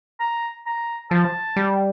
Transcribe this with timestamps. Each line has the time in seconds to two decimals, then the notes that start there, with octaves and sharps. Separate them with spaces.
0.20 A#5
0.66 A#5
1.11 F3 A5
1.56 G3